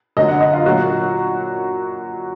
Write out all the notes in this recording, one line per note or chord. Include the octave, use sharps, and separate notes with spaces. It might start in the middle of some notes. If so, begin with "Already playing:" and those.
F#2 D3 F#3 D#5
F#5
D#5
F4
A#2 F#3 F#4